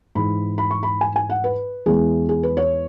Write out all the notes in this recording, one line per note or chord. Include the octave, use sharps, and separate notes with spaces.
G#2 E3 G#3 B5
B5
C#6
B5
G#5
G#5
F#5
B4
E2 E3 G#3 G#4
G#4
B4
C#5